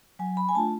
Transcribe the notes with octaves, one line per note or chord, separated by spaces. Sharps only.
F#3 G#5
B5
G#5
A3 D4 F4 A5